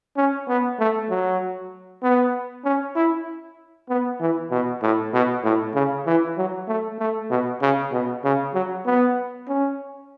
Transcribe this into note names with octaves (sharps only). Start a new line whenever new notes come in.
C#4
B3
A3
F#3
B3
C#4
E4
B3
E3
B2
A2
B2
A2
C#3
E3
F#3
A3
A3
B2
C#3
B2
C#3
F#3
B3
C#4